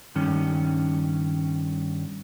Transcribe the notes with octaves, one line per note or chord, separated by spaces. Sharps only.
G2 D#3 C#4